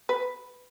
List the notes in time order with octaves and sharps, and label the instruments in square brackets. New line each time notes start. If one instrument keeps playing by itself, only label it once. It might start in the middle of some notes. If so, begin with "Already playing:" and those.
[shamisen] B4